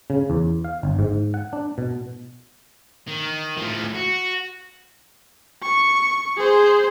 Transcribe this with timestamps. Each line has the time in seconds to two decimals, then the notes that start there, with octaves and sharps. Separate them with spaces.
0.10 C#3
0.30 E2
0.64 F5
0.83 G1
0.99 G#2
1.34 F#5
1.53 D4
1.78 B2
3.08 D#3
3.57 A2 F3
3.95 F#4
5.63 C#6
6.37 G#4 C5